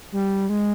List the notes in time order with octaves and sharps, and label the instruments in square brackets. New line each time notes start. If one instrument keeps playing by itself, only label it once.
[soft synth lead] G3
G#3